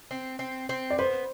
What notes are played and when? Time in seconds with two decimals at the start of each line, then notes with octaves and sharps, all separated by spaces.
0.11 C4
0.39 C4
0.69 C4
0.90 D5
0.98 B3 C5